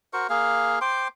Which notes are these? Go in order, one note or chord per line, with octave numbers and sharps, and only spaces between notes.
F#4 A#4 C5 C#6
A#3 G#4 F5
C5 G5 C6 D6